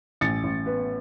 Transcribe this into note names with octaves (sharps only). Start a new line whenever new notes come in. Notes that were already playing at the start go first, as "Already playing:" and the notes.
A1 A6 C#7
A1
B3